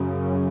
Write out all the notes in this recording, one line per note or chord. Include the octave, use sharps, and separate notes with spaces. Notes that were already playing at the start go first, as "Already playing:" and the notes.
Already playing: F#2 C#3